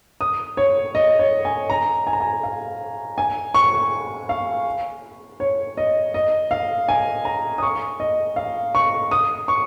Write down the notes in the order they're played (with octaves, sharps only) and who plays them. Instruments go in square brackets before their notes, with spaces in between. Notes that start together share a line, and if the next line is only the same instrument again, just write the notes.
[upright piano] D#6
C#5
D#5
C#5
G#5
A#5
G#5
A#5
G#5
F5
G#5
C#6
F5
C#5
D#5
D#5
F5
G#5
A#5
D#6
C#6
D#5
F5
C#6
D#6
C#6